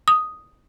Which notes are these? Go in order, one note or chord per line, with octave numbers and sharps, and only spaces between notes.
D#6